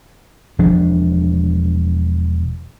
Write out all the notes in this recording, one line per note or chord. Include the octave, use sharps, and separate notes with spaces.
E1 F3 D4